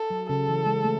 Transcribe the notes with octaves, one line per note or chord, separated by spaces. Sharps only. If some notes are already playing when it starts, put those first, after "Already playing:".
Already playing: A4
F#3
C#3 A4
E3
G#3
A3